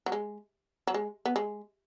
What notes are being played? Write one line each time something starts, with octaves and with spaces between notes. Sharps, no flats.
F#3
G#3
F#3
G#3
B3
G#3